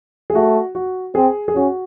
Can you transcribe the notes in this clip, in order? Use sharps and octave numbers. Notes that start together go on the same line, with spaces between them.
G#4
A3 F#4
F#4
C4 G#4
G#4
C#4 F#4